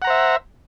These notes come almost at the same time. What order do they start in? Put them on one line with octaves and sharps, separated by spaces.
F#5 A#5 C5 E5